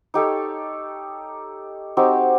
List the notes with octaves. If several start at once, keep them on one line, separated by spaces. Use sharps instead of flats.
D#4 G4 A4 C#5
C4 D#4 F#4 G4